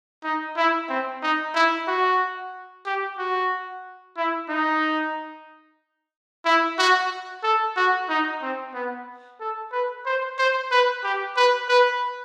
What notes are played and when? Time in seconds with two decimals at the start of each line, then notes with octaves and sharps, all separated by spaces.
0.24 D#4
0.57 E4
0.89 C4
1.22 D#4
1.55 E4
1.88 F#4
2.86 G4
3.18 F#4
4.17 E4
4.49 D#4
6.45 E4
6.78 F#4
7.43 A4
7.76 F#4
8.09 D#4
8.42 C4
8.74 B3
9.40 A4
9.72 B4
10.06 C5
10.38 C5
10.71 B4
11.04 G4
11.36 B4
11.69 B4